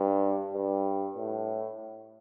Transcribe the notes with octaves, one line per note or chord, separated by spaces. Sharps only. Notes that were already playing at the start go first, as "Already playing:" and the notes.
Already playing: G2
G2
A2